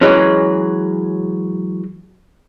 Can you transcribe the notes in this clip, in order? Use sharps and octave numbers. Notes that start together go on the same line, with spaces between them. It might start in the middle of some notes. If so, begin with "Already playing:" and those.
E3 F#3 G#3 C#4